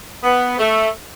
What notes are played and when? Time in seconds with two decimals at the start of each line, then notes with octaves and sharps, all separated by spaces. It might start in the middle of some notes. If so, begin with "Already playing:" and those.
0.23 B3
0.58 A3